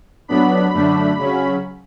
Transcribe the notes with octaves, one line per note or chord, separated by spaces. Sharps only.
A2 F#3 B3 D4 B5
F#2 D3 A3 D4
C#3 F#3 C#4